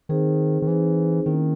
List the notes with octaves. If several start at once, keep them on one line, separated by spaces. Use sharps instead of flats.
D#3 C4 D#4 G#4 C5
D#3
E3 C4 D#4 G#4 C5
D#3 A#3 C#4 E4